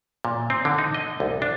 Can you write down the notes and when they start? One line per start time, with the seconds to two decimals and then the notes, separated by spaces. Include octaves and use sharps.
0.25 A#2
0.50 C4
0.65 D3
0.78 D#4
0.94 D#5
1.20 C2
1.42 D4